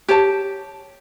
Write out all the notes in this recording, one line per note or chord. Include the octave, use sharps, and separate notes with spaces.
G4 C#5 A5